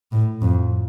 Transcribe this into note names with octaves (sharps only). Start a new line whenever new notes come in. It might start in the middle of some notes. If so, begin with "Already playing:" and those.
A2
F2